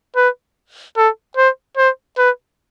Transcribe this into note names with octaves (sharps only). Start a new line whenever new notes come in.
B4
A4
C5
C5
B4